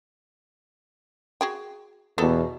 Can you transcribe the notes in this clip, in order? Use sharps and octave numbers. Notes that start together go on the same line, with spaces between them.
F#4 G#4 G5
E2 B2 B3 G4 A4 A#5